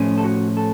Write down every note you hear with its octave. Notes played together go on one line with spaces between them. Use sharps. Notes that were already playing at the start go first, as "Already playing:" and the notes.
Already playing: A2 F3 A3 C#4
A4
F#4
A4